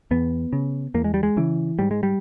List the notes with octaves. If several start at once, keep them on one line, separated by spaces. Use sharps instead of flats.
E2 B3
C#3
E2 A#3
G#3
G3
G#3
C#3 E3
G#2 G3
G#3
G3